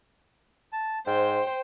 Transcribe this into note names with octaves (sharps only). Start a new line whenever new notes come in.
A5
G#2 C5 G5